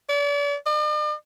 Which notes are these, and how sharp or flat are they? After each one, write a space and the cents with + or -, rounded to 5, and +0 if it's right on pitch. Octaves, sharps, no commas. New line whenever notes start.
D5 -40
D5 +45